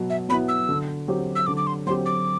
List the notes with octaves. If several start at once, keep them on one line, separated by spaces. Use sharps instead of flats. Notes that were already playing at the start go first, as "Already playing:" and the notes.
Already playing: B2 F#3 B3
E5
F#3 B3 E4 B5
E6
D3
F#3 C4 G4
E6
D3 D6
D6
C6
F#3 C4 G4 C6
D6